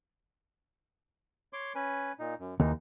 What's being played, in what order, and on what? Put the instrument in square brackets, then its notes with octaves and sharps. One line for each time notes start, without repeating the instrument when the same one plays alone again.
[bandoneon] C#5 C6 D6
C#4 B4 G#5
A#2 D#4
F#2
[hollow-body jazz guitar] D#2 [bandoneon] E3 D#4